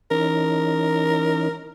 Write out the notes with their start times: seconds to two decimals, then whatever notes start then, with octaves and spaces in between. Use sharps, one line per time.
0.11 E3 C#4 D#4 A#4